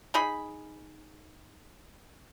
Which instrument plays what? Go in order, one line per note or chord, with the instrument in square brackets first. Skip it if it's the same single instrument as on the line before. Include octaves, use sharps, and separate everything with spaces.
[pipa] D#4 G#4 B5